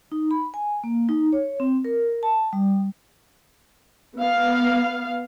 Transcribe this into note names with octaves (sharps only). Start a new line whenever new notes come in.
D#4
B5
G#5
A#3
D#4
C#5
C4
A#4
A5
G3
B3 F5